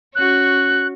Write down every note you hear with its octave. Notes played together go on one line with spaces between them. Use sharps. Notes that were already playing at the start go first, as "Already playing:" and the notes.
C#4 F#4 F#6